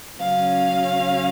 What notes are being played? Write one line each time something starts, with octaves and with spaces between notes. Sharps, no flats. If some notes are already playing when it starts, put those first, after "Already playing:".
C#3 F#3 C#4 F5